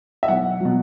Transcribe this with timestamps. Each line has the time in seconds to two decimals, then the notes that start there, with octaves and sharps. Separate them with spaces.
0.23 E5
0.28 B1 F#5
0.60 B2 F#3